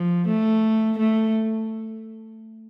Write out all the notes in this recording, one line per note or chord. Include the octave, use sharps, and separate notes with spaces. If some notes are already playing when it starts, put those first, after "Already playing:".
Already playing: F3
A3
A3